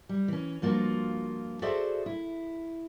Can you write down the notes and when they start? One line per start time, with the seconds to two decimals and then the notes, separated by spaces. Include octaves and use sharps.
0.09 G3
0.28 E3 C#4
0.62 G2 F3 A#3 F4 F#4
1.62 F#4 G#4 A4 C5 D5 E5
2.06 E4